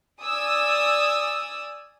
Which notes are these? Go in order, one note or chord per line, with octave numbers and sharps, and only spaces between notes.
D5 G#5 D#6 E6